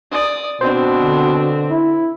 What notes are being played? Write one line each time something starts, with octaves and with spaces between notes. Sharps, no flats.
D5 D#6
B2 C4 D4 C5
D3
E4